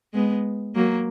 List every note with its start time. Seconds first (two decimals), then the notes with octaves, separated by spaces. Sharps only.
0.14 G#3 B3
0.75 F#3 A#3